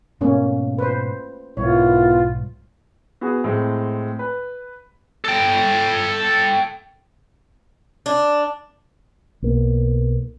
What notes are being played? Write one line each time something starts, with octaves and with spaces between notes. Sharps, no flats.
G#2 B2 A3 A#3 C#4
B4 C5
B1 G#2 D#3 B3 E4 F4 C#5
B3 F#4 G#4
A2 G#3 C4
B4
A4 G5
D4
B1 A#3